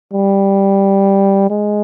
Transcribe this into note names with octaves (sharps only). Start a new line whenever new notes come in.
G3
G#3